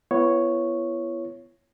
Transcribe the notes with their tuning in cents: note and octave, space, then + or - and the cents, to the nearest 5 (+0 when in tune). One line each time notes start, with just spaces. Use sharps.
B3 +0 E4 +45 C#5 +0